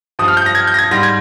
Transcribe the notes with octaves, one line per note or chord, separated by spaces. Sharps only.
G2 F3 D#6
F6
G6
A#6
G#6
G6
A#6
G#6
G#2 G3 A#6
G#6